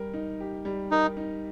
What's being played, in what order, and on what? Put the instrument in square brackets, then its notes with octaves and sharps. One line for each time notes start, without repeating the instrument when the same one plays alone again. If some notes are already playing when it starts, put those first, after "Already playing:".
Already playing: [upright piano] G3 A#4
D#4
G4
G3
[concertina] D#4 [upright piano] A#4
[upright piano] D#4